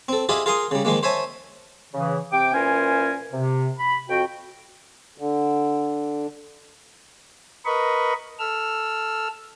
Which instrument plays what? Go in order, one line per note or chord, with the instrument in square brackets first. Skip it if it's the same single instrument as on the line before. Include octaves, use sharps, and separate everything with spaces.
[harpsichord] C4 A4
E4 F4 G4 G#4 D#5
F4 G#4 A#4 A#5 C6 D#6
C#3 G3
D#3 F3 G#3 A#3
C5 C#5 E5 G#5 A5
[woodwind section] C#3 E3
C3 G5 D6
A#2 E3 C#4 A#4 C5 G#5
C3
B5
F2 F#4 G5
[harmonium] D3
[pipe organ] A#4 B4 D#5 B5 C#6
A4 E6 F6